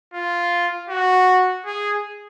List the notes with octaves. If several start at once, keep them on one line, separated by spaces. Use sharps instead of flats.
F4
F#4
G#4